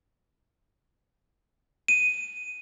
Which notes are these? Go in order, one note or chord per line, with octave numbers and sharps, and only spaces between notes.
D#7